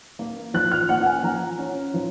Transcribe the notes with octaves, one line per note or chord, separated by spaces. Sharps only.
A#3
F3 F#6
F6
A#3 F#5
F#5
G#5
F3 A#5
C#4
F3